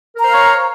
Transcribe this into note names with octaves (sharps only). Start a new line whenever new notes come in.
A#4 C5 C#5 F5 A#5